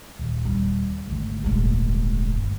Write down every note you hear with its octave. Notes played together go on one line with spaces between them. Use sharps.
D#1
G3
G#1 D2
D#1 G#3
G1